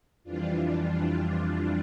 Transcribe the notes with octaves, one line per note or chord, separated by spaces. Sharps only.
F2 E3 G3 D4 F4
D4 F4
D4 F4